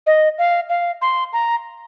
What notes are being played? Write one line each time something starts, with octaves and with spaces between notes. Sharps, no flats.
D#5
F5
F5
C6
A#5